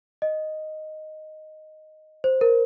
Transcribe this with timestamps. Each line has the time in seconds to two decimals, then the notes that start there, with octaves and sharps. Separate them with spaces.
0.22 D#5
2.24 C5
2.41 A#4